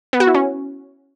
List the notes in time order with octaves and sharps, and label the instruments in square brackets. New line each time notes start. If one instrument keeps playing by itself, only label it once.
[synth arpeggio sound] B3
F#4
E4
C#4